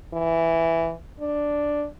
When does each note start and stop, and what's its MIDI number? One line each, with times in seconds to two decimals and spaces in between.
0.13 0.93 52
1.20 1.86 62